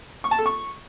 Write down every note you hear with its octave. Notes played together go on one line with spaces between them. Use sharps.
C#6
A5
A4
C#6